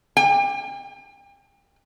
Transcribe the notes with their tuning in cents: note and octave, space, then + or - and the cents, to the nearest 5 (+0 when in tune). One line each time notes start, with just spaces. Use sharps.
G5 +35